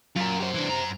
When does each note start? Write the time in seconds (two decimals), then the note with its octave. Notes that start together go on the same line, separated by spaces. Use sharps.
0.16 F#2 F4 A#4
0.40 G4 C5
0.55 E3 D4
0.70 F#2 A#5